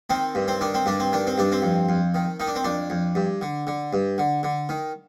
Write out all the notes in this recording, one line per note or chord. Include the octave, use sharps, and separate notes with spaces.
D#3 C4
G2
C4
D#3 D4
C4
G2 D4
C4
D#3 D4
C4
G2 D4
C4
F2
F2
D#3
D#3 D#4
D4
C4
F2 D4
F2
G2
D3
D3
G2
D3
D3
D#3